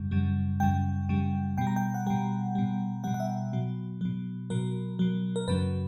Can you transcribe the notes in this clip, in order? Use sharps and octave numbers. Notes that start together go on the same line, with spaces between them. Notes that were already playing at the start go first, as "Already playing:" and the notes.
Already playing: F#2 C#3 G3
F#2 C#3 G3
F#2 C#3 G3 G5
F#2 C#3 G3
B2 G3 G5
A#5
G5
F#5
B2 G3 G5
B2 G3
B2 G3 F#5
F#5
E5
B2 F#3
B2 F#3
B2 F#3 A#4
B2 F#3
A#4
F#2 C#3 F#3 B4